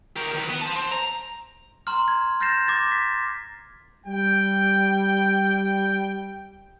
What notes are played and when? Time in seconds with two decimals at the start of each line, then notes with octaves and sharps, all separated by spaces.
0.16 G4 A#4
0.34 D#3 B4
0.49 B3
0.61 C5 A5
0.76 C4
0.91 A#5
1.87 A#5 C6 F6
2.08 G#6
2.40 F6 G6 A6 A#6 C7 E7
2.68 D6 G#6 A6
2.92 B6
4.06 G3 G5